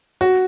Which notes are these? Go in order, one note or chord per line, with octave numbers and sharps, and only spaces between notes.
F#4